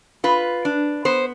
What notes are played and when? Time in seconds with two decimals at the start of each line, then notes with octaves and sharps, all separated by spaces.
0.24 F4 B4
0.65 D4
1.05 B3 C5